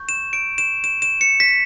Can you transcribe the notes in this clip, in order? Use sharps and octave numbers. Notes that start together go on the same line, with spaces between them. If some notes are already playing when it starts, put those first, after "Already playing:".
Already playing: C#6 G6
E7
D7
E7
E7
E7
C#7
B6